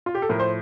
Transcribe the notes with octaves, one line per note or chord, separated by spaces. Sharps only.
F4
G4
A4
A2 F3 A#4
C5